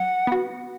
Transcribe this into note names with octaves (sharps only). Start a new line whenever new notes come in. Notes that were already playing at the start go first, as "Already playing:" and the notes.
Already playing: F#3 F#5
B3 F#4